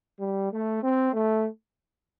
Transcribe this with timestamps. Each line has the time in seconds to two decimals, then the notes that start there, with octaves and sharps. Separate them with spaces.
0.19 G3
0.51 A3
0.82 C4
1.13 A3